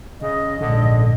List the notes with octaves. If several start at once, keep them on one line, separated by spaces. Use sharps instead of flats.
C#3 D#5
A#1 G#2 D3